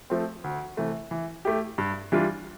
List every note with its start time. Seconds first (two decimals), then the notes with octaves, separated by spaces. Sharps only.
0.10 F3 A3 C4
0.44 D2
0.77 C3 E3 A3
1.11 E3
1.45 A3 E4 G4
1.78 G2
2.12 E3 G3 D4 F4